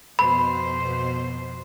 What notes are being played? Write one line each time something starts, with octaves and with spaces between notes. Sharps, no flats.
F2 B2 C5 B5